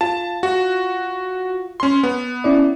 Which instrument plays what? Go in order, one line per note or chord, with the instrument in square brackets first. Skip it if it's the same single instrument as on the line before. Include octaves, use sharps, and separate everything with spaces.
[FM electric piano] F4 [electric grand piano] A5
[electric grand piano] F#4
C#4 C6
B3
[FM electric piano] C#4 E4 D5